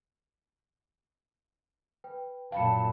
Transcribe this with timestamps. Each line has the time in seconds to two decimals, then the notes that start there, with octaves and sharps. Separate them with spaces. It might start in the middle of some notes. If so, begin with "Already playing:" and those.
2.04 B4 G5
2.52 F#2 A#2 F5 G5 A5 B5 C#7